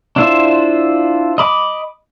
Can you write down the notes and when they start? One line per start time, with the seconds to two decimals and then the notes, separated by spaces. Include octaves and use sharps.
0.16 D4 E4 F4 C5 E5
1.38 D#5 B5 D6